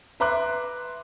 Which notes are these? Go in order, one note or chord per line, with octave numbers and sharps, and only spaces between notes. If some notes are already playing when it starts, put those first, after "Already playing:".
B4 E5 A#5 C6 D6 F#6